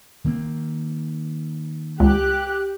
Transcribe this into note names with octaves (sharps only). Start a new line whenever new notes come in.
D#3 A#3 C4
C#2 G4 F#6